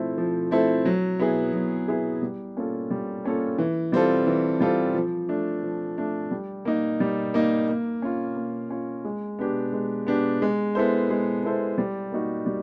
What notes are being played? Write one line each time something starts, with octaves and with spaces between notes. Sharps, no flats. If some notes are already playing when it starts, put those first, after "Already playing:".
Already playing: F3 A3 C4 E4 A4
F3
A3 C4 E4 A4
F#3
B3 E4 G#4
F#3
B3 E4 G#4
G3
A#3 C#4 F4 A4
G3
A#3 C#4 F4 A4
E3
G3 C4 F4 A4
E3
G3 C4 F4 A4
F3
A3 D4
F3
A3 D4
G3
A#3 D#4
G3
A#3 D#4
A#3
C#4 F4
A#3
C#4 F4
G#3
B3 D4 G4
G#3
B3 D4 G4
G#3
B3 E4 A4 C5
G#3
B3 E4 A4 C5
G3
A#3 D#4 F#4
G3